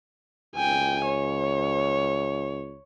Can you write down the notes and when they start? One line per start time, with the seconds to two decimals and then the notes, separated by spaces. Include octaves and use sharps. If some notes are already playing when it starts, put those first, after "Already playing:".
0.56 C#2 G5 G#5
1.06 C#5